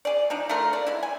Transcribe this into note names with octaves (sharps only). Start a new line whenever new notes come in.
G#4 D5
F3 D4 D#4
A3 F4 A#4
D4 D5
G#3 E4
G#5